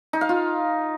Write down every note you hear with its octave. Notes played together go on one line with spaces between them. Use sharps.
D#4
F5
F4